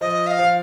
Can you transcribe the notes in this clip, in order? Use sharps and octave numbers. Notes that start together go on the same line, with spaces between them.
F3 D#5
F5
F3